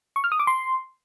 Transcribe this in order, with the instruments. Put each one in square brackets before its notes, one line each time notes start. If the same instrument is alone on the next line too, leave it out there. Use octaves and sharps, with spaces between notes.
[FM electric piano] C#6
F6
D#6
D6
C6